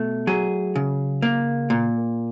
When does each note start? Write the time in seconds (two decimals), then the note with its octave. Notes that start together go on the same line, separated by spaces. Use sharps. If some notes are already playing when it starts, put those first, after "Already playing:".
Already playing: B2 A3
0.27 F#3 G#4
0.76 C#3
1.22 A#3
1.70 A#2